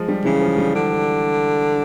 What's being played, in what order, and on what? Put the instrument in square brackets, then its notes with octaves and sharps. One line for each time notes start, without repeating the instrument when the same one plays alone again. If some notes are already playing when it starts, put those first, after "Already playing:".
Already playing: [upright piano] F3 G#3
G3
[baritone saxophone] C#3 [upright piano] E3
[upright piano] F3
G3
[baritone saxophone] D3